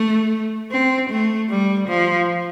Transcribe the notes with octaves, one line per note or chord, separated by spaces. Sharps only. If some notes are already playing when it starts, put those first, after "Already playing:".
Already playing: A3
C4
A3
G3
F3